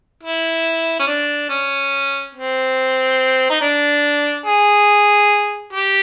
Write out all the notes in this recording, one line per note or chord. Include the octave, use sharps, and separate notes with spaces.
E4
C#4
D4
C#4
C4
D#4
D4
G#4
G4